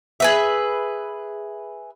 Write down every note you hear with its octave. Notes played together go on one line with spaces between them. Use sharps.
G#4 B4 E5